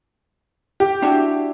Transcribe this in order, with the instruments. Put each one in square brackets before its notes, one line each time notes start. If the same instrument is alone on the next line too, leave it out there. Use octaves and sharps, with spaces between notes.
[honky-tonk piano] G4
[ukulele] D4 E4 F#4